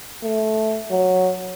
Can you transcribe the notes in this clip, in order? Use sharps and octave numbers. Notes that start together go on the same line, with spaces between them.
A3
F#3